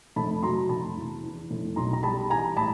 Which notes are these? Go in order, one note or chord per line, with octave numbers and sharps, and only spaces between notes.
F1 A5 B5
F#3 A#5 C6
F1 A5 B5
E2
E2
F1
B1 A#5 C6
A#5
G3 A5 B5
E3 G#5 A#5
A2 A5 B5